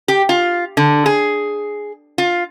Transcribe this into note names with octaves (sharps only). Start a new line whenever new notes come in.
G4
F4
D3
G#4
F4